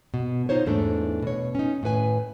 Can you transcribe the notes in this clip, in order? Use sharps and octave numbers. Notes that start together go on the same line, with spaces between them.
B2
D#4 F4 C5 C#5
E2 G#2 A3 D4
B2 C#5
C#4 D#4
A2 D#3 B4 G#5